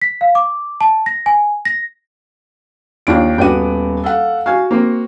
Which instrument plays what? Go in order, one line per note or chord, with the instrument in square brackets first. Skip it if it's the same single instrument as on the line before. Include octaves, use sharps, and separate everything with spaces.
[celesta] B6
F5
D6
A5
A#6
G#5
A#6
[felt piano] D#2 D7 [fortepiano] E3 D4 F4
[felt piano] D#1 B3 D#7 [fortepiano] F#4 D5 G5
[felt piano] A4 F5 F#5
[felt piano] F#4 [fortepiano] F5 G#5
[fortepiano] A#3 C4